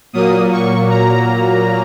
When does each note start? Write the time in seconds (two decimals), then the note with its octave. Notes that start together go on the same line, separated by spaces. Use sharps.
0.13 A#2 F#3 A#3 D#6
0.52 C#6
0.90 A#5